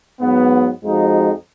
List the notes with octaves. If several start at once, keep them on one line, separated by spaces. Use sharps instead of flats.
G#2 F#3 B3
F2 F3 G#3 D#4 F#4